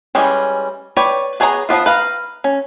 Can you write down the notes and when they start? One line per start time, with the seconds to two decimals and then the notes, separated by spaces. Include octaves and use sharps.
0.15 E3 G3 G#3 C#4
0.97 B4 C#5 D5 G5
1.40 B3 G#4 C#5 G5 A#5
1.69 F3 F#3 B3 F4
1.86 B4 F5 A#5
2.44 C#4